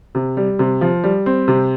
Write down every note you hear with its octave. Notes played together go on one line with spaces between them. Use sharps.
C3
G3
C3
F3
G3
C4
C3